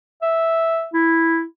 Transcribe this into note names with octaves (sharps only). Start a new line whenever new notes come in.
E5
E4